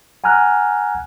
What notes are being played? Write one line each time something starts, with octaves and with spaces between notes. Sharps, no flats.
F#5 G#5 A#5 F6 F#6